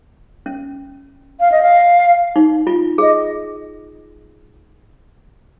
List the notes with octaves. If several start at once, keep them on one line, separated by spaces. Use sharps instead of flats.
C#4
F5
D#5
F5
D#4
F4
G#4 D#5